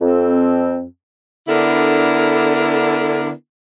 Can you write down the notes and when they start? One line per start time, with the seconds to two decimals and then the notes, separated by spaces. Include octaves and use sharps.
0.01 F2 C4
1.48 D3 B3 D4 E4 A4 A#4